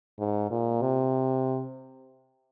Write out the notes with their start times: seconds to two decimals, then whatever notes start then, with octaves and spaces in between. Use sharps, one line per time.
0.19 G#2
0.51 A#2
0.81 C3